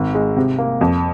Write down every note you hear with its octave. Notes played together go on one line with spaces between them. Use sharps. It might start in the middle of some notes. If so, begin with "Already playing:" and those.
Already playing: G#1
G#3
C3
A#3
F2